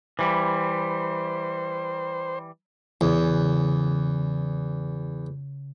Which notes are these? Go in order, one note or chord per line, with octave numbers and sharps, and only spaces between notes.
E3 G3 C5
E2 C#3